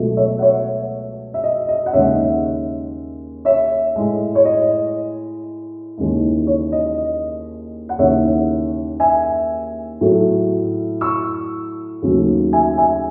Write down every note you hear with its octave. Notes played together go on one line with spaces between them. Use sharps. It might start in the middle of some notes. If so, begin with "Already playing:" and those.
Already playing: C#2 B2 F#3 A3
C#5 E5
F#5
C#5 E5
E5
D#5
D#5
F#5
D#2 C#3 G#3 C#5 E5
C#5 E5
A2 G#3
C#5
D#5
D#2 C#3 E3 G#3
C#5
D#5
D#5
F#5
D#2 C#3 E3 C#5 E5
E5 G#5
A2 F#3 A3
C#6 E6
D#2 C#3 F#3 A3
E5 G#5
E5 G#5